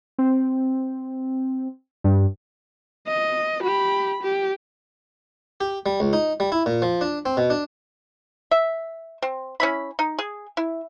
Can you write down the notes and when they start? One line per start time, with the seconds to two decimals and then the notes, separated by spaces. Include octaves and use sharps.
0.18 C4
2.04 G2
3.07 D#5
3.63 G4 B5
4.23 G4
5.61 G4
5.86 G3
6.00 C#2
6.13 D#4
6.40 G3
6.52 E4
6.66 A#2
6.82 F3
7.01 D4
7.26 C4
7.37 B2
7.50 D4
8.51 E5
9.22 C4
9.60 C#4 E4 B5
9.99 D#4
10.19 G#4
10.57 E4